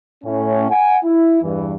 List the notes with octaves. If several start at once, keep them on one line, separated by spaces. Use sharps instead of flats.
A2 C#4
F#5 G#5
E4
E2 G2 E3